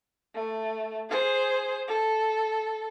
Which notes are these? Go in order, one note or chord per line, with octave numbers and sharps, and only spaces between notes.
A3
G#4 C5
A4